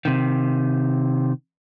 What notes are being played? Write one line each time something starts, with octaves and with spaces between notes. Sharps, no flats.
C3 D#3